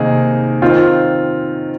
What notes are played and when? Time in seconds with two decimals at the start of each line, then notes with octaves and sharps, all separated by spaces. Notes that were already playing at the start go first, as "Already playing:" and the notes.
Already playing: C3 D#3 A#3 D#4 G#4
0.62 D#3 C4 F4